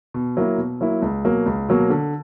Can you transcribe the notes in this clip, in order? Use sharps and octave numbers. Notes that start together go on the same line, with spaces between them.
B2
F#3 A#3 E4
B2
F#3 A#3 E4
C#2
B2 F#3 A#3
C#2
B2 F#3 A#3
D3